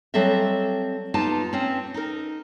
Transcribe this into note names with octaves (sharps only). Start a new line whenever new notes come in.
F#3 G3 C4 A4 D#5 E5
B3 D#4 F4 G4 A5
C4 C#4
D#4 A#4